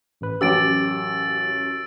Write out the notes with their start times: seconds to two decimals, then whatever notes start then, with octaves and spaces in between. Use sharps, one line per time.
0.21 A1 B4
0.41 A1 F#2 F#3 G4 E6 A6 D7